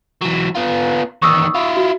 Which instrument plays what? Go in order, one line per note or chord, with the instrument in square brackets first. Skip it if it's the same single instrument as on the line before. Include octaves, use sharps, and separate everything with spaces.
[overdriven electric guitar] E3 F#3
B3 F4
[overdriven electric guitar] E2 D#3 [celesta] C#6 D#6 E6
[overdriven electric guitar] E4 F4
[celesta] F#4